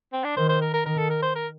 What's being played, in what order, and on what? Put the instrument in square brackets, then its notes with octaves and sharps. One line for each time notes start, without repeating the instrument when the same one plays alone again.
[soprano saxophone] C4
D4
[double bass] D#3 [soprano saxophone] C5
[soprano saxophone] C5
A#4
A#4
[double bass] D#3 [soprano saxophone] A#4
[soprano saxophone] A4
A#4
C5
A#4